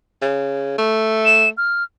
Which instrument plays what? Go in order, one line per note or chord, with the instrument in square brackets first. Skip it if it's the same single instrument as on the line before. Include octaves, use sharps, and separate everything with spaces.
[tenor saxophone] C#3
A3
[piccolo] E7
F6